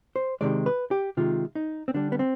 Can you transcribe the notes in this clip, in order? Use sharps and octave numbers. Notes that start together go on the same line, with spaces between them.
C5
C3 D#3 G#3 D5
B4
G4
C3 D#3 G#3 F4
D#4
C4
D3 G3 D4
B3
C4